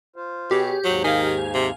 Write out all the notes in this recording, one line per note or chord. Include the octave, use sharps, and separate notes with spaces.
F4 C5
B2 G4 G#4 C#5
D#2 G#2 F#3
D#3 F5 G#5
C3